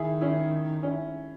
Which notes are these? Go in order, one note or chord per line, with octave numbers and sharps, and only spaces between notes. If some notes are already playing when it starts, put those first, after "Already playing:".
Already playing: D#3 E4 G#4
C#4 E4
C#4 E4